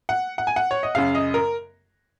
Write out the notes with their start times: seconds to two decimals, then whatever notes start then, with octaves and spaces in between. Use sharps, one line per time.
0.09 F#5
0.38 F#5
0.47 G#5
0.56 F#5
0.71 C#5
0.83 D#5
0.95 F#2 C#3 F5
1.15 D#5
1.34 A#4